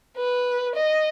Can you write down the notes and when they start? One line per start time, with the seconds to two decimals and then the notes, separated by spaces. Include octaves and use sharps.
0.17 B4
0.75 D#5